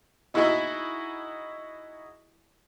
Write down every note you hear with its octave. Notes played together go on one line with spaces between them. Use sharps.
D#4 E4 F#4 G#4 D#5 E5